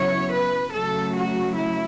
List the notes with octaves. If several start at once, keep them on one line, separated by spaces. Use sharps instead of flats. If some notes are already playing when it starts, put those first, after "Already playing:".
Already playing: C#3 F#3 B3 E4 C#5
B4
C#3 F#3 A3 A4
F#4
E4